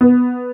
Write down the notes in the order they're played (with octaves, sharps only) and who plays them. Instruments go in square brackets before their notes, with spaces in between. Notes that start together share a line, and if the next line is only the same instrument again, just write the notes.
[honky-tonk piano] B3